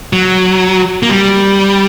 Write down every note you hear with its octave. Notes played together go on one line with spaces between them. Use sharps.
F#3
A#3
G3